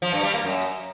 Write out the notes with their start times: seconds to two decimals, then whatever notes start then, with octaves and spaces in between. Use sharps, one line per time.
0.02 F3
0.13 G2
0.23 G3
0.34 A#3
0.44 F#2